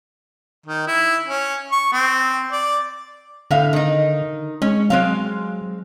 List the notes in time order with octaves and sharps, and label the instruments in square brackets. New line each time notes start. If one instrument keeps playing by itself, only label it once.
[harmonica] D#3
E4
C#4
C#6
C4
D5
[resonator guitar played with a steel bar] A2 E5 F5 [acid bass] D3
[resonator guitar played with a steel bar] D#3 D#4
[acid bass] G#3 [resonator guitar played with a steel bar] C#4
[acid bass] F#3 [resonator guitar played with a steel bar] G#3 C4 F5